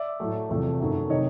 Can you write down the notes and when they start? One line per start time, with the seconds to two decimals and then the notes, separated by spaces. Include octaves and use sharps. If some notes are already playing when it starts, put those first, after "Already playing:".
Already playing: D5 E5
0.20 A2 F#3 A3
0.49 E2 C3 F3 A3
0.80 F#2 D#3 F#3 A3
1.09 C3 D#3 C#5 D#5